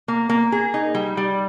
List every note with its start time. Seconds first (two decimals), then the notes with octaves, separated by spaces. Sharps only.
0.08 A#3
0.29 A#3
0.52 G#4
0.74 D#4
0.95 G3
1.17 G3